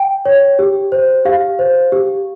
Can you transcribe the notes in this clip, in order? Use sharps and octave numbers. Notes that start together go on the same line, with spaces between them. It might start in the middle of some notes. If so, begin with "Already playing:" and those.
Already playing: G5
C#5
G4
C5
G4 F5
C5
G4